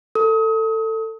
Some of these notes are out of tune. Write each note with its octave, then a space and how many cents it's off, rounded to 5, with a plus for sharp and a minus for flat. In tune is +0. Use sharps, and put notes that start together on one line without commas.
A4 +20 D#6 +35